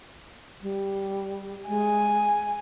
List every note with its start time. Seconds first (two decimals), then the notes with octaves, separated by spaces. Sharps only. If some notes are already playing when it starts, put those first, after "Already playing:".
0.62 G3
1.68 G#3 G#5